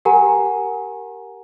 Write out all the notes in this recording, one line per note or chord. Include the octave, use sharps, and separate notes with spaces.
G4 A#4 F#5 G#5 A#5